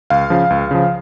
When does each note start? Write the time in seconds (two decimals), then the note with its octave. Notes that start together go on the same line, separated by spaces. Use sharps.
0.10 C#2 F5
0.30 C#3 F3
0.50 C#2
0.71 C#3 F3